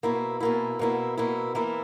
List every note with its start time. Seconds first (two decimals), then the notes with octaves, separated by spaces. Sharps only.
0.03 B2 A#3 E4
0.40 B2 A#3 E4
0.79 B2 A#3 E4
1.17 B2 A#3 E4
1.55 E3 A#3 E4